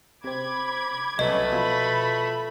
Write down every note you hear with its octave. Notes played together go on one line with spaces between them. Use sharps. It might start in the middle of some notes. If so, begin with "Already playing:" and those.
C3 C4 B5 D6 G#6
C2 F#3 A3 B3 C#4 B4 D#5
B2 F3 F4 B5